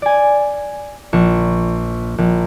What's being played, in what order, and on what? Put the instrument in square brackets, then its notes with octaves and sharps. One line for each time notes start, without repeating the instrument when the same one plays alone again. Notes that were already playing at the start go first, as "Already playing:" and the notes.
[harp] D5 G#5
A#1 C#6 E7
A#1